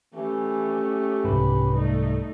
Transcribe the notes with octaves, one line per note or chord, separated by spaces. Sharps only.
E3 A3 C#4 G4
C2 G#2 B4
G3 A3 D#4